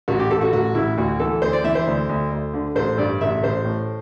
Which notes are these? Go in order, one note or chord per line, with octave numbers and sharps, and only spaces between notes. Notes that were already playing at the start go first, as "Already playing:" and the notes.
A1 F#4
G4
A1 A4
F#4
A1 F#4
A1 E4
D2 F#4
E3 A4
D2 C5
D5
E3 E5
C5
D2
D2
D2
D3
A1 C5
G2 D5
A1 E5
A1 C5
A2